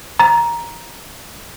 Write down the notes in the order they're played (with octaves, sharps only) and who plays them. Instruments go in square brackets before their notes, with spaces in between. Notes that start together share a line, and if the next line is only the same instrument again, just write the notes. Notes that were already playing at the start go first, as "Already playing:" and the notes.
[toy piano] A#5